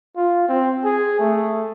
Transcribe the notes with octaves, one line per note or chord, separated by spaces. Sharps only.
F4
C4
G#4
A3